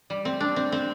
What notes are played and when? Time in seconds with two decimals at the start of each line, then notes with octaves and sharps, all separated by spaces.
0.10 G3
0.25 C4
0.40 D4
0.56 C4
0.72 C4